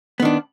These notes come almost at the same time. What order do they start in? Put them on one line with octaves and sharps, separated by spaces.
B3 D#3 D4